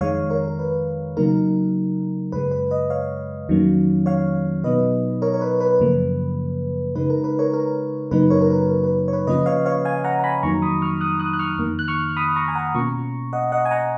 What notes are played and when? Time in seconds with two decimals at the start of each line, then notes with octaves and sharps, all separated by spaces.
0.01 F2 D#3 G#3 C#5 F5
0.30 A#4 C#5
0.48 A#4
0.59 B4
1.17 C#3 F#3 A#3 D#4 A#4
2.32 F#2 C#3 G#3 B4
2.51 B4
2.71 B4 D#5
2.90 C#5 F5
3.49 F2 D#3 F#3 A#3 C#4
4.06 C#5 F5
4.64 B2 F#3 B3 D#4 B4 D#5
5.22 A#4 C#5
5.34 C#5
5.41 B4
5.60 B4
5.80 F#2 C#3 F3 A#3
6.95 C#3 G#3 D#4 B4
7.10 A#4
7.24 B4
7.39 A#4 C#5
7.54 A#4
8.11 F#2 C#3 F#3 A#3 D#4 B4
8.30 A#4 C#5
8.41 A#4
8.50 B4
8.69 A#4
8.84 B4
9.08 C#5
9.13 B4
9.27 C#3 F3 A#3 C#4 F4 B4 D#5
9.46 C#5 F5
9.66 C#5 F5
9.85 F5 G#5
10.04 F#5 A#5
10.19 A#5
10.24 G#5 B5
10.43 F2 D#3 F#3 A#3 D#4 A#5 C#6
10.62 B5 D#6
10.81 C#6 F6
11.01 D#6 F#6
11.20 D#6 F#6
11.33 F#6
11.39 C#6 F6
11.58 F2 D#3 A#3
11.79 F#6
11.88 C#6 F6
12.17 B5 D#6
12.36 A#5 C#6
12.48 G#5
12.55 F#5 A#5
12.74 B2 A#3 C#4 F4 A#5 C#6
13.33 D#5 F#5
13.52 D#5 F#5
13.65 G#5
13.71 F#5 A#5